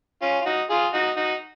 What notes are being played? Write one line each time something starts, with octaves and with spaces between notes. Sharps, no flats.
C#4 F4
F4
D#4 F#4
F4 G#4
D#4 F#4
D#4 F#4